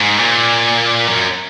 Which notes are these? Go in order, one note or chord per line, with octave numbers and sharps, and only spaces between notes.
G#2
A#2
F#2